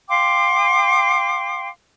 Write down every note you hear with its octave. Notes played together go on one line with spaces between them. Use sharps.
F5 G5 C6 D6